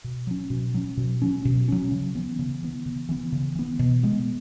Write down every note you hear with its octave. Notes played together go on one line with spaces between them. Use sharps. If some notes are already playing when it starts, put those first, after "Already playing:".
B2
F#3 C#4
B2
F#3 C#4
B2
F#3 C#4
B2
F#3 C#4
C#3
E3 B3
C#3
E3 B3
C#3
E3 B3
C#3
E3 B3
B2
G#3 B3